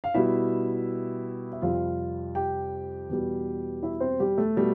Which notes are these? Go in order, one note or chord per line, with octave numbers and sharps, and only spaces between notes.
F5
B2 G3 E4 E5
E5
F2 C3 G3 F4 F5
G4 G5
E2 B2 G3
E4 E5
C4 C5
G3 G4
A3 A4
B2 G3